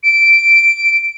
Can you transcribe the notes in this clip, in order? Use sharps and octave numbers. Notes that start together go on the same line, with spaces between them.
D7